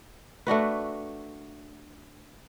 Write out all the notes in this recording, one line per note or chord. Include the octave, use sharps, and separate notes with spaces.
A3 D4 F#4 B4